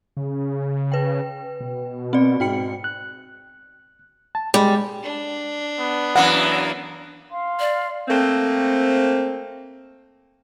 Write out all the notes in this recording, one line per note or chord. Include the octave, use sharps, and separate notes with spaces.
C#3
B4 G5
B2
C4 D5
G#2 F#4 G5 C#7
F#6
A5
G3 G#3
D4
B3
F#2 E3 A#3 F#5
F5 C6
D5
A3 A#3 C4